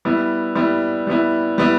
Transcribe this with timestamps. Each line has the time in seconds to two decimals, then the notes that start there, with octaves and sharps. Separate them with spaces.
0.05 G3 B3 E4
0.55 G3 B3 E4
1.07 G3 B3 E4
1.58 G3 B3 E4